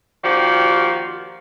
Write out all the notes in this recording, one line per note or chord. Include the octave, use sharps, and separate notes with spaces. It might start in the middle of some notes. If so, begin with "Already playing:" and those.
D#2 D#3 F3 F#4 G4 D5